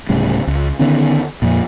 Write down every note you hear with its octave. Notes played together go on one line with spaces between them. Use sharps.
D1 A2 C#3 G3
C#2
D3 D#3 B3 C#4
F2 A#2